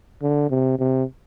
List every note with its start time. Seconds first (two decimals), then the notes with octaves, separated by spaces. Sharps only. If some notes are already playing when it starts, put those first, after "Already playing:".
0.22 D3
0.50 C3
0.79 C3